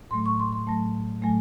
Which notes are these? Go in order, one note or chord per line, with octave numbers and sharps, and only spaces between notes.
A2 F#3 A3 C6
C#6
C6
C6
A2 F#3 A3 A5
A2 F#3 A3 G#5